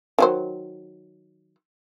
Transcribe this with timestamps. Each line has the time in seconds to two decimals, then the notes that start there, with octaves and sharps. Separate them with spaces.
0.19 D#3 F#3 C5